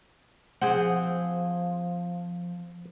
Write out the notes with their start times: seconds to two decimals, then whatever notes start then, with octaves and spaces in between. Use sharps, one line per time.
0.62 F3 C4 G#4 F#5